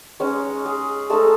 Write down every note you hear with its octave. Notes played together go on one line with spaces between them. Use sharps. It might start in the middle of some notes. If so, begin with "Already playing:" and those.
G#3 C#4 D#4 C#5
G#4
G#3 A3 D#4 A4